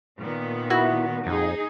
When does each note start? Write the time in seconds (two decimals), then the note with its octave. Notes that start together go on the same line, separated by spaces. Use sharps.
0.19 A#2 D#3 B3
0.70 E4 F#4
1.27 F2 D#4 G#4